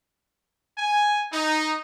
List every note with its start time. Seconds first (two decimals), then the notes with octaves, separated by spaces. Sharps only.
0.78 G#5
1.32 D#4